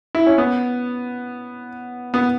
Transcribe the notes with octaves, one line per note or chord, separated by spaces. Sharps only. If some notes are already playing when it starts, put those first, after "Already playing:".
E4
C#4
B3
B3